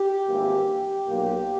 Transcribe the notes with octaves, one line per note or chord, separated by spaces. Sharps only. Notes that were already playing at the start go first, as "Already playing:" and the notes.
Already playing: G4
G#1 G2 E3 A#3
B1 A#2 A#3